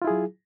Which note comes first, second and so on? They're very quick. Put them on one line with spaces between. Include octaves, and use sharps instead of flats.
F4 E4 G#4 F#3